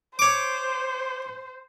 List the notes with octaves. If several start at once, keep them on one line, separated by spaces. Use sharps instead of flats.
C5 C#5 D6